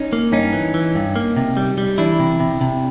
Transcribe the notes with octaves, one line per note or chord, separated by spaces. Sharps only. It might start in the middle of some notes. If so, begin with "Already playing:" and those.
Already playing: C#4 D#4
A#3
G2 C#4 D#4
E3
E3
G2
A#3
C3
G3
G3
E3 D4 E4
C3
C3
C3